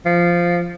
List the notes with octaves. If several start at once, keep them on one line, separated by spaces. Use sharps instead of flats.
F3